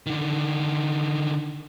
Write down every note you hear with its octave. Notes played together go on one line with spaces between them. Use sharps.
D3 D#3